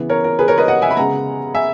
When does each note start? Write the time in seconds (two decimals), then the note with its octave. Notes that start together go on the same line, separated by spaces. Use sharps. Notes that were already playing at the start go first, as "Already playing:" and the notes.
Already playing: C#3 E3 B3
0.09 A#4 C#5
0.24 A#4
0.39 G#4 B4
0.48 A#4 C#5
0.58 B4 D#5
0.68 D#5 F#5
0.82 E5 G#5
0.91 B5
0.97 C#3 G#3 B3 F#5 A#5
1.54 E5 G#5